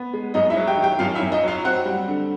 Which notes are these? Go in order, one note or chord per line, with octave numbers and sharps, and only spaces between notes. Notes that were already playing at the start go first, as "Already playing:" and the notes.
Already playing: B3
G#3
F#2 D#4 D#5
E4 E5
F#3
G4 G5
D#3
G4 G5
F#2 F4 F5
E4 E5
F#2
D#4 D#5
F#3 F4 F5
C4 F#4 F#5
G3
D3